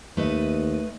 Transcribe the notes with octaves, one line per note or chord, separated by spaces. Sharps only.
D#2 A3 B4 D#5